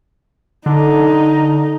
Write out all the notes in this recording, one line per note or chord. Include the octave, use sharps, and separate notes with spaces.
D3 D#4